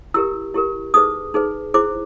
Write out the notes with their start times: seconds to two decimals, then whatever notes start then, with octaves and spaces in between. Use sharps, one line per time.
0.14 E4 G4 A#4 E6
0.54 E4 G4 A#4
0.94 D#4 G#4 B4 D#6
1.34 D#4 G#4 B4
1.74 E4 G#4 C5 D6